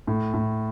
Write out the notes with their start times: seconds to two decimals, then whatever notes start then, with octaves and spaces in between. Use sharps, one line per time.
0.07 A2
0.34 A2